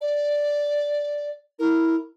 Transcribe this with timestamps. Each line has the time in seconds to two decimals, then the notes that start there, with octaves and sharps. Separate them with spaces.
0.01 D5
1.59 E4 A#4